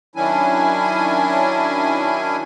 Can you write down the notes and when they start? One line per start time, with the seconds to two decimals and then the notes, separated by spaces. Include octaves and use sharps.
0.16 D#3 F#3 C#4 D4 E4 G#5